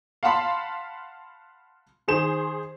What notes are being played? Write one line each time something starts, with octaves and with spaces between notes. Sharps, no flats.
F5 F#5 A5 B5 C6
D#3 G#4 C5 E7